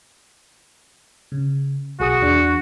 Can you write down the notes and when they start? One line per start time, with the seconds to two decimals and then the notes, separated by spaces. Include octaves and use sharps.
1.32 C#3
2.00 B1 F#4 G#4 D#6
2.22 E2 D4